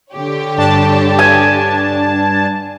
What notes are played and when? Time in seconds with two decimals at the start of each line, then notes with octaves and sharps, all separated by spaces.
0.13 D3 G4 C#5
0.58 G2 D4 A5
1.19 G#5